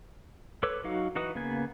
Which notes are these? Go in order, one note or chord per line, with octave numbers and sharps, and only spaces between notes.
A4 B4 C#5 D6 E6
F#3 D#4 F#4 F5
E3 D#4 F#4 B4 D#6
C#3 A#3 B3 G#5